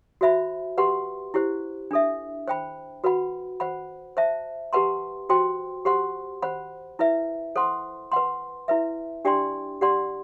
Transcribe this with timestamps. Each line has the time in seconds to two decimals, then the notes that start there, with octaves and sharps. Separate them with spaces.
0.21 F#4 C5 E5 B5
0.78 G4 B4 F#5 C6
1.34 E4 G4 C5
1.91 D4 A4 E5
2.48 C5 G5 B5
3.04 F#4 B4 F#5 B5
3.60 C5 F#5 B5
4.17 C5 E5 A5
4.73 G4 B4 F#5 A5 C6
5.29 F#4 C5 G5 C6
5.85 G4 C5 F#5 C6
6.42 C5 F#5 B5
6.99 E4 B4 E5
7.56 A4 C5 F#5 C6
8.12 B4 F#5 C6
8.68 E4 B4 E5
9.25 D4 G4 D5 G5 C6
9.81 G4 D5 F#5 C6